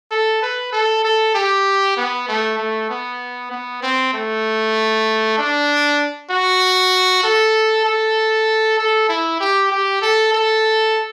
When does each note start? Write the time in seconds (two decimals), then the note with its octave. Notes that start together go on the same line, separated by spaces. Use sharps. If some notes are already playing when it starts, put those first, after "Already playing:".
0.11 A4
0.42 B4
0.73 A4
1.05 A4
1.35 G4
1.97 B3
2.28 A3
2.58 A3
2.90 B3
3.51 B3
3.83 C4
4.14 A3
5.38 D4
6.31 F#4
7.24 A4
7.85 A4
8.79 A4
9.09 E4
9.41 G4
9.72 G4
10.02 A4
10.33 A4